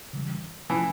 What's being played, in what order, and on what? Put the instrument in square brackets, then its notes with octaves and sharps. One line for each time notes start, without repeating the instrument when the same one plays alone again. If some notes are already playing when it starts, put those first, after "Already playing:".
[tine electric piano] C#3 E3 G3
[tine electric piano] C3 F3 A3 C#4 F4 [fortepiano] E3